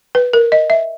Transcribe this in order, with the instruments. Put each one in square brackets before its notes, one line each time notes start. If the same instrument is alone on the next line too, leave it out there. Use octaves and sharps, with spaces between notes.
[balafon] B4
A#4
D#5
E5